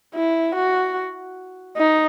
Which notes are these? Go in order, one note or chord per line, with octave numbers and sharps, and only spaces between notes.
E4
F#4
D#4